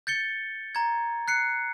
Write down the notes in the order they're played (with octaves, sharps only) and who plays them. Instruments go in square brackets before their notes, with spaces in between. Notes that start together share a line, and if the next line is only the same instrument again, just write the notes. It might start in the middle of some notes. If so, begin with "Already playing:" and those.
[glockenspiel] G6 A6 C#7 G7
A#5 G#6
F#6 C7 C#7